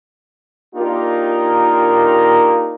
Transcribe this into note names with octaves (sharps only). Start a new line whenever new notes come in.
A#3 D4 D#4 F4 G4 A#4